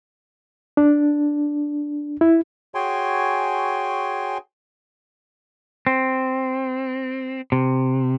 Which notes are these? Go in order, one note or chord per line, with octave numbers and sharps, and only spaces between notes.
D4
E4
F#4 G#4 C#5 G5 G#5 C6
C4
C3